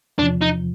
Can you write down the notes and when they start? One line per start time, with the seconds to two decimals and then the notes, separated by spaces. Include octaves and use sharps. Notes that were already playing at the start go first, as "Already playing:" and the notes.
0.19 E2 D4
0.22 C3 F3
0.42 D#4